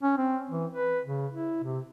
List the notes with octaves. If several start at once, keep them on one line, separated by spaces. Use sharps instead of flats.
C#4
C4
E3
B4
C#3
E4
C3